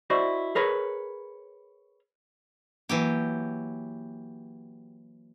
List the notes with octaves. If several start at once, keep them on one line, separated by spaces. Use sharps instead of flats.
E4 F#4 C5 D5 D#5
G#4 A#4 B4 C#5
E3 F#3 A#3 G4